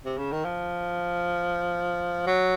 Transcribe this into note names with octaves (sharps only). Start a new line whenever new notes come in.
C3
C#3
D#3
F3
F#3